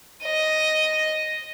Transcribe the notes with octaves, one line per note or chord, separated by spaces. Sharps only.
D#5